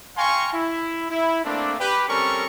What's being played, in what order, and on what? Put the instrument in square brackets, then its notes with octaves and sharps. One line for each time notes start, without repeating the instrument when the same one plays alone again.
[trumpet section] F5 G5 G#5 A#5 C6 C#6
E4
E4
A3 A#3 C4 D4
G4 B4
G3 C4 C#4 A4 A#4 C#6